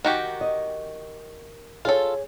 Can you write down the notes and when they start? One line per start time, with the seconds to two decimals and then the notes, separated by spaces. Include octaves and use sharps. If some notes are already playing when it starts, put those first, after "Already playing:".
0.05 D#3 F#4 G4
0.41 D#5
1.85 F4 G#4 A4 C#5